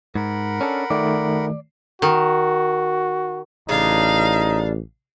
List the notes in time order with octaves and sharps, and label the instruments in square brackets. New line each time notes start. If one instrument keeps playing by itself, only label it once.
[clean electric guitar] G#2 [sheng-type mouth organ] A#4 F#5 B5
[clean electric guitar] C#4 D4 A4
[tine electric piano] D#3 A3 [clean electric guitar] D5
[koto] D#3 [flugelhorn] F#4
[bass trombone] A1 [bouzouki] C#3 D4 [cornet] D#4 [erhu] F5